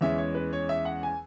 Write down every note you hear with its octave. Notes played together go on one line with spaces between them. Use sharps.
E2 E3 G#3 C#4 E5
C#5
B4
C#5
E5
F#5
G#5